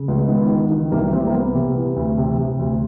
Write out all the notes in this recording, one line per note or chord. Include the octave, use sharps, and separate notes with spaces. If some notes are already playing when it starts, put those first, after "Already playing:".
Already playing: C#3
C#2
D#3 B3
D#3
D#3
C2 A#3
C2 C4
A#3
C2 B3
C3
E3
D2
C3
C3
D2